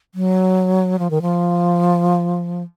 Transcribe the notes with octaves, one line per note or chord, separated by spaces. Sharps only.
F#3
F3
D#3
F3